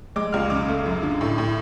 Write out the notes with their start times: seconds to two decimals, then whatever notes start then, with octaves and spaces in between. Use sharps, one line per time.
0.16 G#3 D6
0.33 C#2 F6
0.50 C#3 D6
0.68 A3
0.86 F#2
1.03 D3
1.21 A2
1.38 A2